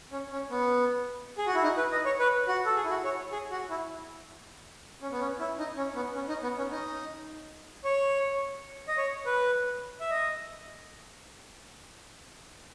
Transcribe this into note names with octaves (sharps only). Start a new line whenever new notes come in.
C#4
C#4
B3
G#4
F#4
E4
D#4
B4
D#5
C#5
B4
F#4
A4
G#4
E4
F#4
C#5
G#4
F#4
E4
C#4
B3
C#4
E4
D#4
C#4
B3
C#4
D#4
B3
C#4
D#4
C#5
D#5
C#5
B4
E5
D#5